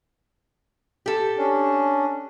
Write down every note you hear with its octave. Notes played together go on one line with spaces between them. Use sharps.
G4 A4
C#4 D4